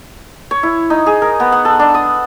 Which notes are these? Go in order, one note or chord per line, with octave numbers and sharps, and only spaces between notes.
C#5
E4
D#4
G#4
A#4
B3
F#5
A4
D4
D#6